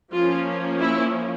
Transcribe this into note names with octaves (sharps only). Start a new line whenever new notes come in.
F3 A#3 C#4 F4
E4